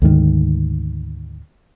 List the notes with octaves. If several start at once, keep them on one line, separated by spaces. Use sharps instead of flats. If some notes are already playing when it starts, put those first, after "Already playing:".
D2 G#2 D#3